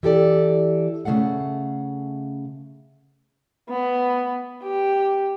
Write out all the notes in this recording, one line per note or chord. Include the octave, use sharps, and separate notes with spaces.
E3 G4 A4 D5
C#3 F#3 A3 F5 F#5
B3
G4